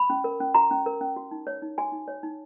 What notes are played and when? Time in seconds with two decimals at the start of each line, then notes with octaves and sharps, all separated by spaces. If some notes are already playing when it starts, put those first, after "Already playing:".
Already playing: B5
0.10 C#4
0.24 A#4
0.40 C#4
0.54 F#4 A#5
0.71 C#4
0.86 A#4
1.01 C#4
1.16 F#4
1.31 D#4
1.47 C#5
1.62 D#4
1.78 F#4 G#5
1.92 D#4
2.08 C#5
2.23 D#4